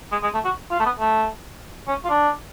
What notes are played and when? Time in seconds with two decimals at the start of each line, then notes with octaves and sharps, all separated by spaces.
0.12 G#3
0.23 G#3
0.34 A3
0.45 F#4
0.71 F4
0.80 A3
0.85 B3
1.00 A3
1.88 C#4
2.05 F4
2.10 D4